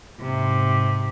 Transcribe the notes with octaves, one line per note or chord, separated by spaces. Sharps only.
G#2 C3